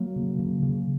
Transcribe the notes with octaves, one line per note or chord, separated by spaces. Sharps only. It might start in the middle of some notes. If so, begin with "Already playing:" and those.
Already playing: F#3 A#3
C#3
C#3
C#3